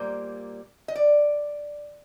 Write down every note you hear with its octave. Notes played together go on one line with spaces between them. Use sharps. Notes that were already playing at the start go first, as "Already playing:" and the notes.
Already playing: A#2 G3 A#3 C5
D#5
D5